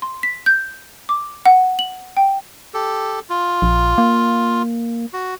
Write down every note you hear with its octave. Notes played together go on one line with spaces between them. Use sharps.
C6
B6
G6
D6
F#5
F#7
G5
G4 A4
F4
A#1
A#3
F#4